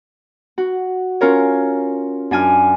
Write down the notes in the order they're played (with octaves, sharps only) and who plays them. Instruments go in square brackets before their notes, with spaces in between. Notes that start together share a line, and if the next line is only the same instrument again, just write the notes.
[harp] F#4
C#4 F4 A#4 C#5
F#2 D4 G#5 F6